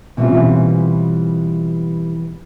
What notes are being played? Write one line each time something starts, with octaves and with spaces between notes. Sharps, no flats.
B2 E3 G3 C4 C#4 F4